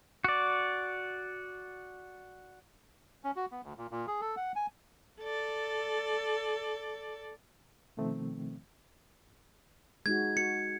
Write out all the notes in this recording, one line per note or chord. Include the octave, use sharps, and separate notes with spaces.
F#4 D5
C#4
F#4
B3
D2
A#2
A#2
G#4
A4
F#5
G#5
A4 D5
B2 D#3 F3 A3 C4
G#3 D#4 F#4 G#6
F#4 C#7